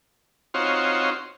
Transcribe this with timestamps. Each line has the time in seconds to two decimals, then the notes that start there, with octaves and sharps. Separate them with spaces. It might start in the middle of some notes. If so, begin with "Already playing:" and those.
0.54 C4 D#4 F4 F#4 C5 C#5